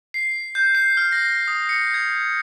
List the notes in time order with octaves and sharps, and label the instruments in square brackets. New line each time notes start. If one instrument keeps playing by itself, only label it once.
[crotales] C7
G6
C7
F6
A#6
D#6
C#7
G#6